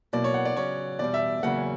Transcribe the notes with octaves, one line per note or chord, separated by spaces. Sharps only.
B2 F#3 A#3 E4 D5
C#5
F#5
D5
C#3 F#3 C#4 C#5
E2 B2 G3 D5
E5
E2 C#3 F#3 A#3 C#4 F#5